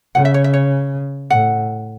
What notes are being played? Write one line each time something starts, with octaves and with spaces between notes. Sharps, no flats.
C#3 F#5
E5
C#5
E5
C#5
A2 F#5